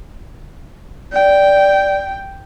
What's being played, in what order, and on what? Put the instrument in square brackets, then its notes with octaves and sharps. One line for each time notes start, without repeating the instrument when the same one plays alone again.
[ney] D5 [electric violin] G5